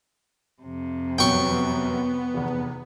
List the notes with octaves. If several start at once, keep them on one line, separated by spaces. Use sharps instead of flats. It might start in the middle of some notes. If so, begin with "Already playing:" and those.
F2 C3
F#2 F#3 B3 G5 C#6
F1 E2